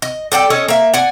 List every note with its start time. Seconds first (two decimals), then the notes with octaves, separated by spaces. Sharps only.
0.02 D#5
0.32 A4 D5 F#5 G5
0.50 C#4 A4 C#5 D#5
0.68 A#3 E5
0.94 D5 F#5 G#5